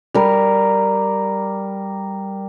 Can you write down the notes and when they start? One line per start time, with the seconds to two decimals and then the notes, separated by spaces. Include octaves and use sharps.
0.14 G3 A#4